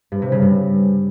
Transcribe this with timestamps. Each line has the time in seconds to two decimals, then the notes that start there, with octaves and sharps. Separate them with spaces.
0.12 G2
0.22 C3
0.32 C#3
0.42 G2